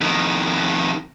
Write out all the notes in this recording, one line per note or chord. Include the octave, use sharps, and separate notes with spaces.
F2 D#3